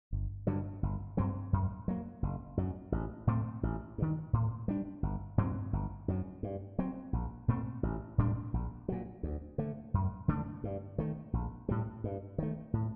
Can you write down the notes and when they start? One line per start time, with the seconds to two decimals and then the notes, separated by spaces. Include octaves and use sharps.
0.13 G1
0.47 G2 D3 F#3
0.83 G1
1.17 G2 F#3 C4
1.53 F#2
1.88 F#3 A#3
2.23 F#1
2.57 F#2 F#3
2.92 A1
3.27 A2 A3 C4
3.63 A1
3.98 G2 D#3
4.33 A2
4.68 G3 D4
5.03 G1
5.38 G2 F#3 C4
5.73 G1
6.08 F#2 F#3
6.43 G2
6.79 F#3 C4
7.13 A#1
7.48 A#2 A3 C4
7.83 A1
8.18 A2 G3 D4
8.54 A#1
8.88 A#2 F#3
9.23 D2
9.58 D3 A3
9.94 F#2
10.28 D3 A3 D4
10.64 G2
10.98 D#3 A3
11.33 A#1
11.69 A2 G3
12.04 G2
12.38 D#3 A3
12.73 A2